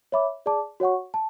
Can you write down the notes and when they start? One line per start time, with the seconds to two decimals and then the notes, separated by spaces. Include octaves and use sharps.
0.12 C#5 E5 B5 D6
0.46 G#4 D5 A5 D6
0.80 F#4 C#5 F#5 C#6
1.14 A5